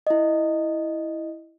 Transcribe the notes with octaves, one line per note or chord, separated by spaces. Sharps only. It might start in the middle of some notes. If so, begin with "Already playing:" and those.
E4 D#5